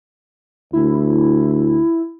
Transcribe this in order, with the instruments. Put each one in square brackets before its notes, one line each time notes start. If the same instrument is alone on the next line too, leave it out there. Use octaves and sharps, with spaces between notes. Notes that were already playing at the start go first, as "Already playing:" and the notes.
[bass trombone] D2 [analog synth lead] E4